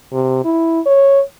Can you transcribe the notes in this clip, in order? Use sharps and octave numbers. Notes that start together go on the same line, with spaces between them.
C3
E4
C#5